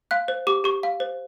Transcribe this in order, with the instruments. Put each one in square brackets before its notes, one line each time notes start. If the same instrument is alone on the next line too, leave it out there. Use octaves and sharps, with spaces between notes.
[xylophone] F5 F#6
C5
G4 D6
G4 C#6
F5
C5